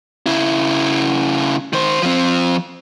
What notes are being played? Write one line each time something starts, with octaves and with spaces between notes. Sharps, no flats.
C#3 E4
D#3 C5
F3 C4